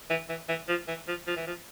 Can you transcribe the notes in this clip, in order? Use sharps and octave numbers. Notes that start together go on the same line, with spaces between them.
E3
E3
E3
F3
E3
F3
F3
E3
F3